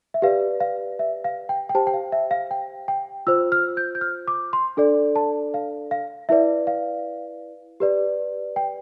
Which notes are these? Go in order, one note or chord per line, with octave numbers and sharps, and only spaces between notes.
E5
G4 B4 D5 F5
F5
E5
F5
G5
G5
G4 C5 A5
G5
F5
E5
F5
G5
G5
F4 C5 E6
F6
G6
G6
F6
D6
C6
D4 A4 D5
A5
F5
F5
E4 B4 D5 E5
F5
G4 B4 D5
G5